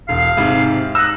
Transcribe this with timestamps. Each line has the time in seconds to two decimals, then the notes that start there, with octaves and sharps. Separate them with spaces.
0.09 E1 F5
0.37 G#2 C3
0.95 D#4 E6 F#6